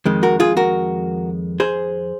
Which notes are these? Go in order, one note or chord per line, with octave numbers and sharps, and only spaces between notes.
F2 D#3 G#3
F#4 A#4
F4 G#4
F#4 A#4
G#4 C5